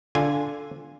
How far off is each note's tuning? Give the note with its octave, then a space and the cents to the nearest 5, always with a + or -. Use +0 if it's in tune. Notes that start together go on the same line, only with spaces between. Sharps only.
D3 -10 F4 +0 G#5 -10